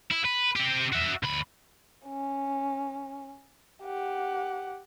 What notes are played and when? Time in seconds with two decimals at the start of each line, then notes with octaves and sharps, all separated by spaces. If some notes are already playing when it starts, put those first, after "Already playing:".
0.11 E4
0.25 B4
0.56 C4 G4
0.92 F#4 E5
1.23 D2 B5
2.06 C#4
3.84 G4 F#5